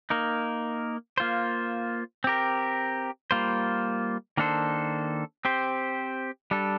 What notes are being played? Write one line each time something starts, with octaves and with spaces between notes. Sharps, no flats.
A#3 D#4 A#4
A#3 F4 C5
C4 G4 A#4
G3 A#3 F4 C5
D#3 A#3 D4 A4 C5
C4 G4 C5
G3 D4 A4